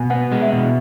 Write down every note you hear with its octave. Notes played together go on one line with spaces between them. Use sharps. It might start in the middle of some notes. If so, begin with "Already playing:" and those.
Already playing: B2 G#5
B3 F#5
G#3
E5
B2